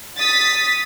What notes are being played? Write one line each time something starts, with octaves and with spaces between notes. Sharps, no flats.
D#6 A6 B6